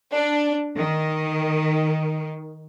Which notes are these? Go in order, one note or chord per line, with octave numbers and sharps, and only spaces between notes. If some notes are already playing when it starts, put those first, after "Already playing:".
D4
D#3